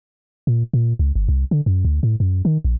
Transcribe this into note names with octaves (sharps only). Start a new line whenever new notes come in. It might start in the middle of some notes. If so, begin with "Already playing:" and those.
A#2
A#2
C#2
G1
C2
D3
F#2
D2
A2
F#2
D#3
A#1